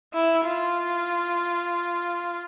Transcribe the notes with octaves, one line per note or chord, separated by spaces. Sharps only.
E4
F4